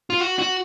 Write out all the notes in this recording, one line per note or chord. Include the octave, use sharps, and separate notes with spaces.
F4
F#4
F#4